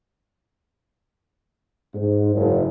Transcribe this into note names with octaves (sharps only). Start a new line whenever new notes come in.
G#2
F#1